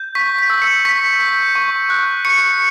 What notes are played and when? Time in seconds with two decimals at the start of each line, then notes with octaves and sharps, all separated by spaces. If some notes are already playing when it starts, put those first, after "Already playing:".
Already playing: G6
0.15 C#6 B6
0.39 B6
0.50 E6
0.62 C#7
0.85 C#6 B6
1.20 G6
1.55 C#6
1.90 F#6
2.25 C#6 C#7